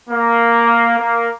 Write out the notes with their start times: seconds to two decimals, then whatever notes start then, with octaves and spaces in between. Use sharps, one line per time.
0.10 A#3
0.99 A#3